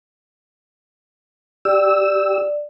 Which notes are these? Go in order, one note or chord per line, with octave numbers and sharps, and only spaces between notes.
G4 D5 E6